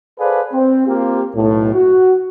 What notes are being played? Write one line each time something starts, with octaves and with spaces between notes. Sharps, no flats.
G#4 A4 B4 C5 D5 F5
C4
A#3 C4 F4 G4
B1 A2
F#4